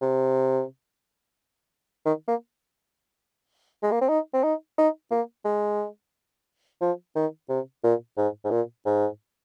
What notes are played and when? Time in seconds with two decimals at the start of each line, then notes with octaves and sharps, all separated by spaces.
0.01 C3
2.06 D#3
2.28 A#3
3.83 G#3
3.91 A#3
4.01 C4
4.09 D#4
4.33 C4
4.44 D#4
4.78 D#4
5.11 A#3
5.45 G#3
6.81 F3
7.16 D#3
7.49 C3
7.84 A#2
8.17 G#2
8.44 G#2
8.51 A#2
8.86 G#2